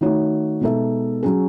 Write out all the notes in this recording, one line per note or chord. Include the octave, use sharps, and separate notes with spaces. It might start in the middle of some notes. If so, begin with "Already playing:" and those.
D#3 A3 D#4 F#4 C#5
B2 G#3 D#4 A4 E5
F#3 C#4 G#4